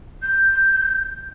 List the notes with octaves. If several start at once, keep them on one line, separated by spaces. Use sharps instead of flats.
G6